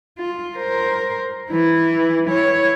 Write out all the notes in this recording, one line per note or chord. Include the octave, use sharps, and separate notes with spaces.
F4
A#4 C5
E3 E4
E4 C#5